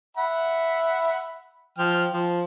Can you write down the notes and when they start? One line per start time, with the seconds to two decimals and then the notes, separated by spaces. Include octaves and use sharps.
0.17 E5 F#5 B5
1.79 F3 G5 F6
2.13 F3